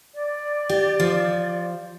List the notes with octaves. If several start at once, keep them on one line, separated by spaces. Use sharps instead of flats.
D5
G4
F3